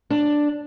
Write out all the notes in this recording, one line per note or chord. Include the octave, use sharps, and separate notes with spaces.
D4